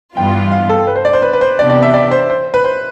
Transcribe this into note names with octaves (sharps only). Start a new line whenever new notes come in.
G2 E3 B3 F4 G5
F5
A4
B4
C5
D5
C5
B4
B4
C5
C3 E3 B3 D4 G4 D5
D5
E5
D5
C5
C5
B4
C5